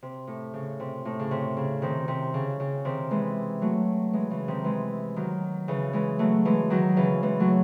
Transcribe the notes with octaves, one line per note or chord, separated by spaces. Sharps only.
C3
A2
C#3
C3
A2
C#3
C3
C#3
C3 D#3
C3
C#3
C#3
C3 D#3
E3 G#3
F#3 A3
E3 G#3
C#3 E3
C3 D#3
E3 G#3
D#3 F#3
C#3 E3
E3 G#3
F#3 A3
E3 G#3
D#3 F#3
C#3 E3
E3 G#3
F#3 A3